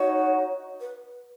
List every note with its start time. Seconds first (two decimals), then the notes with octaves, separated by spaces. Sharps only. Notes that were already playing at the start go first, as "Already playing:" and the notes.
Already playing: D#4 F#4 C#5
0.80 B4